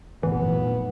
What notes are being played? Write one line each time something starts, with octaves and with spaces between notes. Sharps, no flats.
F1 A#1 F#2 E3 B3